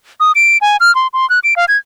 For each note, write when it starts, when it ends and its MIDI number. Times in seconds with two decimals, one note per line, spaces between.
0.20 0.32 87
0.35 0.58 98
0.61 0.77 80
0.80 0.94 89
0.95 1.07 84
1.13 1.28 84
1.30 1.39 90
1.44 1.54 98
1.56 1.65 77
1.68 1.77 92